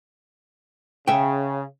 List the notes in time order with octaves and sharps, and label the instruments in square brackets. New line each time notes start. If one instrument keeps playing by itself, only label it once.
[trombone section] C#3 [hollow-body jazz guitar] E5 G5